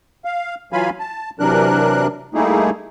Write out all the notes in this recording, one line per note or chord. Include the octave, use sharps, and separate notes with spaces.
F5
E3 F#3 F4 F5 G#5 B5
A5
C3 E3 F#3 D4 A#4 F#6
G3 A3 A#3 D#4 E4 G#4